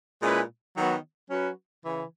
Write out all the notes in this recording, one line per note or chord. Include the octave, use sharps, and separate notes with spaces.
A#2 G#3 C#4 E4 B4
D#3 F#3 B3 F#4 C#5
F#3 C#4 F#4 B4
C#3 E3